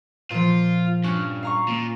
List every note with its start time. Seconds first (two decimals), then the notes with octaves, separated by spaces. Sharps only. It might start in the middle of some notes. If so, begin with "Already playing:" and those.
0.31 A#2 F3 F4
1.04 G2 C#4 F#6
1.43 F5 A#5 C#6
1.68 A#2